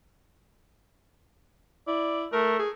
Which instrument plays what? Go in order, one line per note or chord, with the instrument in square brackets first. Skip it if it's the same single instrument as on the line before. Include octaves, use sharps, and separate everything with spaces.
[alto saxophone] E4 [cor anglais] D5
[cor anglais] A3 [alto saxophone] A#4
[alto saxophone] G#4